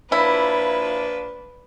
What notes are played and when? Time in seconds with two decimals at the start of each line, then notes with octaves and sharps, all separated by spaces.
0.12 A#2 F3 D4 E4 B4